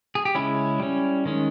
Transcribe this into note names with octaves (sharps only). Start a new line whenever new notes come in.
G#4
G4
C#3 G#3 C#4 E4
G3 C#4
D#3 G#3 C#4